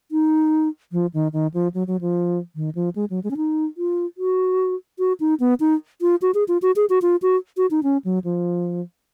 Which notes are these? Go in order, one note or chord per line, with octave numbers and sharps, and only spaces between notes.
D#4
F3
D#3
D#3
F3
F#3
F#3
F3
D#3
F3
G#3
F#3
G#3
C#4
D#4
F4
F#4
F#4
D#4
B3
D#4
F4
F#4
G#4
F4
F#4
G#4
F#4
F4
F#4
F#4
D#4
C#4
F#3
F3